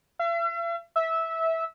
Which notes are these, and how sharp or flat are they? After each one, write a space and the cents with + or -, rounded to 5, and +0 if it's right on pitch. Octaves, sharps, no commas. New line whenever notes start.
E5 +45
E5 -15